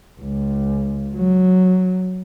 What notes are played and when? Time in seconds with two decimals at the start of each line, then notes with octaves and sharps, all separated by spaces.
0.21 C#2
1.15 F#3